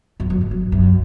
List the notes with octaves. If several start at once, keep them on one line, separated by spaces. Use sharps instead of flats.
F#2
F#2
G#2
F#2
F#2